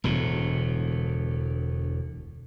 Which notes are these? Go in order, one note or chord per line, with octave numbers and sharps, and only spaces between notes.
E1 D2 A2